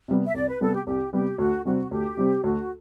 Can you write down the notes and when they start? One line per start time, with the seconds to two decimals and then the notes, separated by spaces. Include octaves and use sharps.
0.08 C3 G3 B3
0.26 E5
0.34 C2 D5
0.48 B4
0.61 C3 G3 B3 A4
0.74 G4
0.86 C2 G4
1.13 C3 G3 B3 G4
1.38 D2 F#4
1.65 C3 G3 C4 F#4
1.91 D2 G4
2.17 C3 G3 C4
2.44 D2 F#4